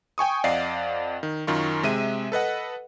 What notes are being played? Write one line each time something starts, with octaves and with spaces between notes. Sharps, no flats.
G5 G#5 C#6 D#6
F2 D5 D#5 F5 F#5 C7
D#3
F#2 D#3 F4 C#6
C3 G#3 E5 D#7
A4 B4 D#5 F#5